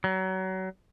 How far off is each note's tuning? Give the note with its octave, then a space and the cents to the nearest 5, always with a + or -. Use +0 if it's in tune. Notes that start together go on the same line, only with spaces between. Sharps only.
F#3 +30